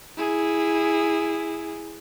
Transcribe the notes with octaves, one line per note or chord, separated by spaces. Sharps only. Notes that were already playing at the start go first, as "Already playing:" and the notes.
E4 G#4